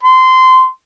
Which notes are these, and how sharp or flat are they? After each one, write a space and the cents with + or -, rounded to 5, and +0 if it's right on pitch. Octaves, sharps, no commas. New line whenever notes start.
C6 -20